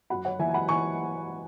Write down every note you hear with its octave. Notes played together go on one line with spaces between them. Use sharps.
F#2 F#5 B5
C#5 F#5
E3 E5 G#5
G#5
F#5 B5
E3 G#5 C#6